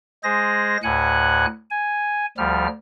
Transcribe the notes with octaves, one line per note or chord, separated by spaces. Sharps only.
G#3 G#4 C5 A#6
D2 A2 F#5 G#5 F#6
G#5
D2 F3 G3 F6